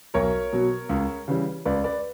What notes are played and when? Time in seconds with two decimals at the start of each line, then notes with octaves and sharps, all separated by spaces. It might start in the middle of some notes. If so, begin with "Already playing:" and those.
0.14 B1 A#4 C#5
0.53 B2 F#3
0.89 C#2
1.28 C#3 E3 G3
1.65 C#2 B4 D5
1.84 B4 D5